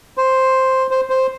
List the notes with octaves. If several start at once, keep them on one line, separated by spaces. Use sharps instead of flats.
C5
C5
C5